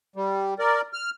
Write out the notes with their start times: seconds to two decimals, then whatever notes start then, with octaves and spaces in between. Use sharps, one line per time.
0.16 G3
0.59 A#4 D5
0.93 F6